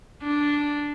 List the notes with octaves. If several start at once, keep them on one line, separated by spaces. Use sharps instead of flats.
D4